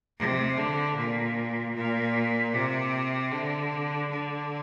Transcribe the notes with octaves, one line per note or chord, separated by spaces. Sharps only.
C3
D3
A#2
A#2
C3
D3
D3